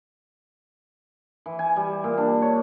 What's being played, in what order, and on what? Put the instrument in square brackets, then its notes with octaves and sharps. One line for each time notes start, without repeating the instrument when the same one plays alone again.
[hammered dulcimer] E3
G#5
G3
A#2
D4
C#5